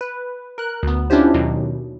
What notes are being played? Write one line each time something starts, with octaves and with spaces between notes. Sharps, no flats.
B4
A#4 F#6
D2 B3
C#4 D4 E4 F4 G4 C5
D#2 B2 D#3 F#3